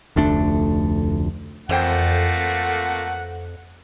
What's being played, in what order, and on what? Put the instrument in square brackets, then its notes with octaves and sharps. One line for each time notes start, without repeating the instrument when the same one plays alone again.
[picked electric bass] F1 D2 A3 D4
[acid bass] F2 [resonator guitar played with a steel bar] E3 C5 G5 [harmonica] F3 A3 A#3 [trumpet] F#5